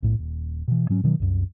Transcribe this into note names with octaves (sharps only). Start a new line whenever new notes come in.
B1 A2
D#1
B2 E3
G#2 F#3 C#4
B2 D#3 F#3
C2 F#2